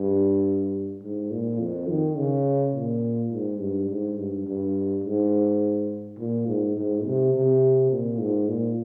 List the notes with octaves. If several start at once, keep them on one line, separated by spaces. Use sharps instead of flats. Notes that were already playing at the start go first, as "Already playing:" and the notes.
Already playing: G2
G#2
A#2
F2
D#3
C#3
A#2
G#2
G2
G#2
G2
G2
G#2
A#2
G#2
G#2
C3
C3
A#2
G#2
A#2